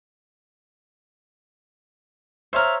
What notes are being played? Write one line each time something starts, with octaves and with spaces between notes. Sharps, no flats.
C5 C#5 E5 F5 A#5